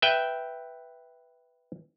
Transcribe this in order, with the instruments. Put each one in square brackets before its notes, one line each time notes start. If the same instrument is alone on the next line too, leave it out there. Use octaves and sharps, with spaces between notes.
[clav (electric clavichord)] B4 E5 G5